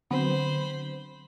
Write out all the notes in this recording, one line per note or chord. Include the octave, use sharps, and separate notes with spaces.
D3 F#3 B3 C4 C5 B5